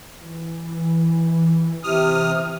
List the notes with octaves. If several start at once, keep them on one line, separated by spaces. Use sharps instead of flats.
E3
C3 D#6 F6